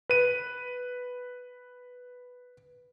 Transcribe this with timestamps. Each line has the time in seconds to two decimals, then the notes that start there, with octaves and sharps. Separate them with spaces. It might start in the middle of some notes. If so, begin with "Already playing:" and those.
0.09 B4 D#7